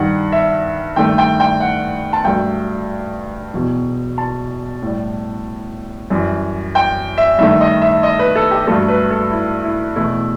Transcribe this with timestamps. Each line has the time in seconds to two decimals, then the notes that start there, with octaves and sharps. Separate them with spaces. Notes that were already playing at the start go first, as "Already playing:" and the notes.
Already playing: G2 D#3 G3 F#5
0.32 E5
0.96 G2 D#3 A3 G5
1.18 G5
1.40 G5
1.60 F#5
2.13 A5
2.25 G2 F#3 A3 G5
3.54 E2 B2 F#3
4.18 A5
4.82 A2 G3
6.10 F#2 E3 G3
6.75 G5
7.18 E5
7.38 G2 D#3 A3 E5
7.61 D#5
7.82 E5
8.03 D#5
8.19 B4
8.36 A4
8.51 G4
8.67 G2 F#3 A3 A4
8.88 B4
9.10 A4
9.31 E4
9.64 E4
9.96 E2 B2 A3 E4